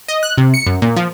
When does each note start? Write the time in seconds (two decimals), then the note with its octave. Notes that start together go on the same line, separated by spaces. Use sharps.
0.08 D#5
0.23 F#6
0.38 C3
0.54 C#7
0.66 F#2
0.82 A#2
0.96 F3